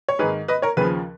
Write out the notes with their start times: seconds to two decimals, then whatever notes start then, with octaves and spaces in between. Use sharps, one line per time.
0.09 C#5
0.19 G#2 D#3 G#4 B4
0.48 B4 D#5
0.62 A#4 C#5
0.77 D#2 C#3 F3 G#4 B4